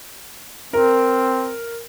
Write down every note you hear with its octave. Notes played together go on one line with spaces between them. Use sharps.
C4 A#4